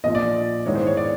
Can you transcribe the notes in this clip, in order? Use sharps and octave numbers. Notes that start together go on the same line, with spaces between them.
A#1 A#2 F3 D#5
D5
G#2 D#3 G#3 B3 E4 C#5
C5
C#5
D5